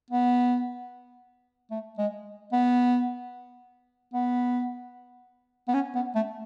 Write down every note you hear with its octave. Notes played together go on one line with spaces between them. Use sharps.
B3
A3
G#3
B3
B3
B3
C#4
B3
A3